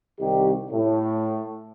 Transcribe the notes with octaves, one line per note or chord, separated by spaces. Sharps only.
C2 D#3 G4
A2